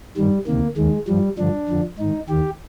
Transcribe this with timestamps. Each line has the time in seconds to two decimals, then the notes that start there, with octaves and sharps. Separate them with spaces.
0.17 G2 D#3 G3
0.47 D2 C3 D#3 A#3
0.77 D#2 D#3 G#3
1.08 G2 F3 G3
1.38 G2 D3 F3 D4
1.69 F2 D3 F3
1.99 G#2 D#3 D#4
2.29 D#2 D#3 G4